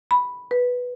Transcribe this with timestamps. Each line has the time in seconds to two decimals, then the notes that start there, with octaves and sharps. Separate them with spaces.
0.11 B5
0.51 B4